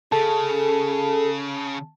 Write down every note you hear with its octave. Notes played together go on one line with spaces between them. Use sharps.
C#3 G#4 A4 A5